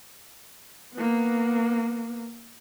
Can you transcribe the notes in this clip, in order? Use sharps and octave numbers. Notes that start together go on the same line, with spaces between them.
A#3 B3